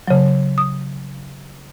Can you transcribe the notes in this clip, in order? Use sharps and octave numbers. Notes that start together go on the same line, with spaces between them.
C#3 F#3
D#6